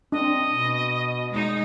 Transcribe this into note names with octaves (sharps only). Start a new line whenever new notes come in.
C4 D4 D#5
B2
G#3 D#4